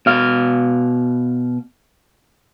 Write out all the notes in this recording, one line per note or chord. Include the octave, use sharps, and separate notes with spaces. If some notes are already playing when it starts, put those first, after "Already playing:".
B2 F5